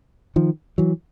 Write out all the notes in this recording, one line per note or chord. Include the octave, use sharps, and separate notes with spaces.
D#3 F3
E3 F#3